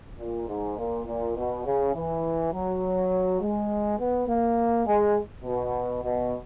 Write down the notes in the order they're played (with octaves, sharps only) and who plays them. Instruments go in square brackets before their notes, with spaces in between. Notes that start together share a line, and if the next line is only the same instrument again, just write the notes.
[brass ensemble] A#2
G#2
A#2
A#2
B2
C#3
E3
F#3
G#3
B3
A#3
G#3
B2
B2